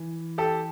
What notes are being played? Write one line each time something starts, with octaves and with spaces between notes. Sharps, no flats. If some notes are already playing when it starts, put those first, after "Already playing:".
Already playing: E3
G4 A4